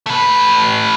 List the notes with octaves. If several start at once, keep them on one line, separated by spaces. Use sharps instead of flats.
A3 B4